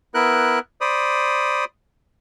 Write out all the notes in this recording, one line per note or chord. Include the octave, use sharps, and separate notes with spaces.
B3 E4 A#4 F#6
C5 D5 B5 D#6